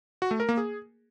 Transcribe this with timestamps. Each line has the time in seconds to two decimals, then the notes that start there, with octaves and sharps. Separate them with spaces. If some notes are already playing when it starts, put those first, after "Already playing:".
0.22 F#4
0.31 A3
0.40 A#4
0.49 A#3
0.57 G#4